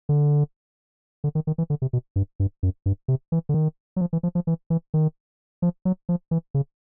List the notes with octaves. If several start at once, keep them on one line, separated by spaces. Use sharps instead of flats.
D3
D3
D#3
D#3
E3
D3
C3
B2
G2
G2
F#2
G2
C3
E3
D3
D#3
F#3
F3
E3
F3
F3
E3
E3
D#3
F3
F#3
F3
E3
C#3